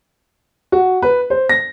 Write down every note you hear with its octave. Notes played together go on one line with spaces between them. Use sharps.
F#4
B4
C5
A#6